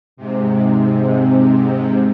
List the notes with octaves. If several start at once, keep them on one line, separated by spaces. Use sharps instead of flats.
G#2 C3